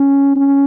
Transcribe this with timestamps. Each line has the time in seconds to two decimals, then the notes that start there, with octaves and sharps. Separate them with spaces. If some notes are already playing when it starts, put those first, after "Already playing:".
Already playing: C#4
0.36 C#4